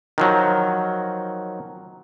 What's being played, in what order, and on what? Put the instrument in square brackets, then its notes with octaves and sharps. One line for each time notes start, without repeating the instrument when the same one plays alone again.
[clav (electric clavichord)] D#3 F3 F#3